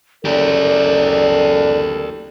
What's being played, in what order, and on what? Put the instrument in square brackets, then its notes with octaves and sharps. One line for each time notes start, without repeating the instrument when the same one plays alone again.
[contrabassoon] F#1 [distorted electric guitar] G4 A#4 [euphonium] A4 [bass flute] D5